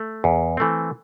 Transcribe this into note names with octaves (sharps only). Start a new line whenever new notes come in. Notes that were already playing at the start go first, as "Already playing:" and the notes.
Already playing: A3
E2
E3 A3 C4